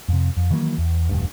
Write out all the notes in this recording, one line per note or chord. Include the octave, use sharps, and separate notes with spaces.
F2 C3
F2
D#3 E3 F#3 A#3
E2
E1 D2 G2